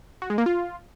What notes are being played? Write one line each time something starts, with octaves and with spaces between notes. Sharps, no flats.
F#4
G#3
A#3
F4